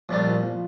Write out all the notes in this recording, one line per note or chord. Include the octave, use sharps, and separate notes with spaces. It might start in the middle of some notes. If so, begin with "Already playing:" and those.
A#1 A#2 F3 G3 D4
F3
F3